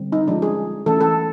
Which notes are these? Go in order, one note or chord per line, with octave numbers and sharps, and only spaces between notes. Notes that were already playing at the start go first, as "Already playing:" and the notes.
Already playing: D3 G3 C4
D#4
F3 G#3 C#4 D4
G#4
E3 A3 C#4 A4
A4